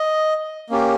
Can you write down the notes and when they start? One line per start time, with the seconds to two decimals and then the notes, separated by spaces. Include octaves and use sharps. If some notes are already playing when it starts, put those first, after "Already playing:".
Already playing: D#5
0.70 A#3 C#4 G4